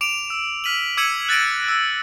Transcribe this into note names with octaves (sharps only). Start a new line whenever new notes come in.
D6 D7 F7
E6
F6 B6 D#7 F#7
D6 E6 G#6 C#7 D#7 F#7
F#6 A6 A#6 D7 D#7
E6